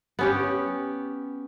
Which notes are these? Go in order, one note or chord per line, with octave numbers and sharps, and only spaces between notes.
B3 C#4 G4